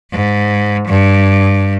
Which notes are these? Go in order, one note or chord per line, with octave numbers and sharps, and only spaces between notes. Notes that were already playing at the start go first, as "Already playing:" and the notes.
G#2
G2